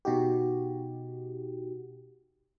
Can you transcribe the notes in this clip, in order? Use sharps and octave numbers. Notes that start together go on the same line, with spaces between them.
B2 D#4 F#4 G4